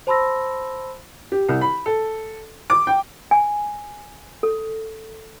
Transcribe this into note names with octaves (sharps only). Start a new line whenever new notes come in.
C5 A5 B5 C6 E6 A#6
G4
C2
B5
A4
D6
G5
G#5
A4